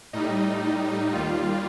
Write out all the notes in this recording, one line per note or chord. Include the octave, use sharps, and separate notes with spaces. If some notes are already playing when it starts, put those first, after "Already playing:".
A2 G3 D#4
D#2 D#3 G3 F4